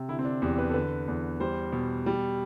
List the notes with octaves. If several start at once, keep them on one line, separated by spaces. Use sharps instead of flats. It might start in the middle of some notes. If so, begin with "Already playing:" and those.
Already playing: C3
D3 E4
C4
D4
E2 G4
B4
A4
D3 B4
E2
G3 C5
B2
G3